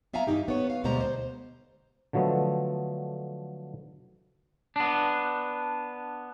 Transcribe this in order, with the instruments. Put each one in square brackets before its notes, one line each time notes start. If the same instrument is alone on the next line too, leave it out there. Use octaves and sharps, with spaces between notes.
[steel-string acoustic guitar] B3 E5 F5 G#5 A#5
G2 E3 D#4 G4
B3 C#5
F5
D2 B2 G3 G#3 C5 A#5
C5
[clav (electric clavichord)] D3 F3 F#3 A3 B3
[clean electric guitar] B3 D4